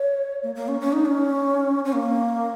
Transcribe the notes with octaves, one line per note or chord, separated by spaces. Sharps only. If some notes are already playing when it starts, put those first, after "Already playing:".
Already playing: C#5
A#3
A#3
C#4
C#4
D#4
C#4
C#4
A#3